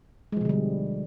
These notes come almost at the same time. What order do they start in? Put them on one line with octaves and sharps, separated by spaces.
G#3 F3 B2 D3 G3